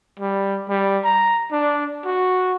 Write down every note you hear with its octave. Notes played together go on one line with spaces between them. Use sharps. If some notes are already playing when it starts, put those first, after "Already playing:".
G3
G3
A#5
D4
F#4